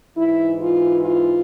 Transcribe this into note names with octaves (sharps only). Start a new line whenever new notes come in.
G#2 E3 E4
F4
F4